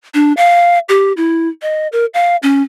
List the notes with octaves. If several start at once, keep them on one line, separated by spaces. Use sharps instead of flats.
D4
F5
G4
E4
D#5
A#4
F5
C#4